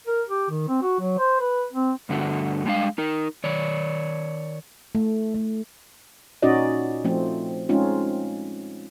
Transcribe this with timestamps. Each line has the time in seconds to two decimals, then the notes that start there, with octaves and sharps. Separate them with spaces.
0.07 A#4
0.29 G4
0.50 D#3
0.68 C4
0.82 F#4
1.00 F#3
1.18 C5
1.40 B4
1.73 C4
2.09 G2 D3 A3 F#4
2.65 G3 G#3 D4 F5
2.98 D#4 A#4
3.44 D#3 C#5 D5
4.95 A3
5.35 A3
6.42 A#2 C#4 D#4 F#4 D5 D#5
7.04 F3 A3 C4
7.69 G#3 C4 C#4 D#4 F4